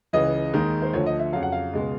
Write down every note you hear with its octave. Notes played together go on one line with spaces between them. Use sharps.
C#2 C#3 E3 D#5
D#2 D#3 G#3
C5
D2 D3 F3 C#5
D#5
E5
F2 C#3 F#3 F5
F#5
F5
C#2 B2 G#3